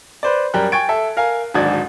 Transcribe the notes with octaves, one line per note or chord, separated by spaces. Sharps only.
B4 C5 D5
F#2 G3 A#4 G5 F#6
G5 G#5 C#6 G#6 A6 D7
A4 E5
A#4 F5 G#5
D1 G#1 G#2 D4 G#6